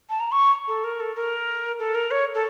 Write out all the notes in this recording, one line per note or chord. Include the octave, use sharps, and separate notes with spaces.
A5
A#5
C#6
A4
A#4
A4
A#4
A4
A#4
C#5
A4